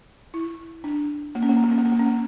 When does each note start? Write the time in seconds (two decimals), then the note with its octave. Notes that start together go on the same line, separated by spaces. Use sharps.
0.34 E4
0.84 D4
1.35 A#3
1.43 C#4
1.49 A#3
1.57 C#4
1.64 A#3
1.71 C#4
1.78 A#3
1.85 C#4
1.92 A#3
1.99 C#4
2.06 A#3